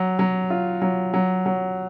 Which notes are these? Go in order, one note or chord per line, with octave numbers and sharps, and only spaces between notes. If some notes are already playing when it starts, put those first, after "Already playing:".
Already playing: F#3
F#3
F4
F#3
F#3
F#3